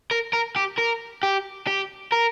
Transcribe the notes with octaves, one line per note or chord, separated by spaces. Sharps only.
A#4
A#4
G4
A#4
G4
G4
A#4